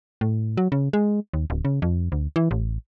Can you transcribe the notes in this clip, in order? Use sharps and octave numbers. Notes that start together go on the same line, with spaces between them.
A2
F#3
C#3
G#3
D#2
D1
C#3
F2
D2
E3
A1